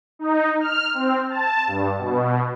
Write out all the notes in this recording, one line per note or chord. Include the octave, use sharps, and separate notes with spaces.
D#4
F6
C4
A5
G2
B2